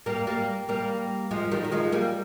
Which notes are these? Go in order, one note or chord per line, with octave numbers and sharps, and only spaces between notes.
G3 A#3
G3 A#3
G3 A#3
F3 G#3
D#3 G3
A#3
F3 G#3
G3 A#3